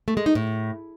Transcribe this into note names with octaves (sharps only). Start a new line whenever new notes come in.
A3
G#3
D#4
A2